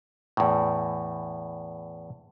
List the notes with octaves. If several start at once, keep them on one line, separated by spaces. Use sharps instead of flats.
E2 A2